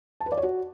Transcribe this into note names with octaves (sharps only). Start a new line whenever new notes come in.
A5
B4
D5
C#5
F#4